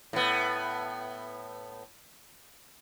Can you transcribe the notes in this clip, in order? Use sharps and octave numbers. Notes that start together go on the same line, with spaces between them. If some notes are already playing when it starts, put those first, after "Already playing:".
A2 B3